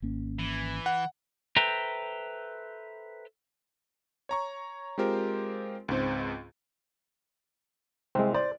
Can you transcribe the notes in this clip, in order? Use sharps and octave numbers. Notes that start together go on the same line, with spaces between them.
G#1 A#3 C#4
E3
F#5
A4 B4 C5 E5 G5 A#5
C#5 A#5 C#6
G#3 C4 F4 G4 A#4 C5
C#2 G#2 C4 C5
C2 G#3 C4
C5 D5